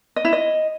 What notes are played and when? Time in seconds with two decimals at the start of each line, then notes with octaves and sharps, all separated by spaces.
0.16 D#5
0.25 E4
0.33 D#5